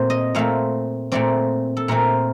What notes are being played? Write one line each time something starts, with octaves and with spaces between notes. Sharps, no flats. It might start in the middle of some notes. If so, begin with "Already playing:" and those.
Already playing: A#2 A3 C4 C5
D#5
A#2 A3 C4 F5
A#2 A3 C4 D5
A4
A#2 A3 C4 A#4